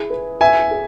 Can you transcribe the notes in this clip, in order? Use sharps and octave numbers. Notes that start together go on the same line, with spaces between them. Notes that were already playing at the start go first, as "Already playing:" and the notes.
Already playing: E4 G#4
B4
B4 E5 G#5
G#4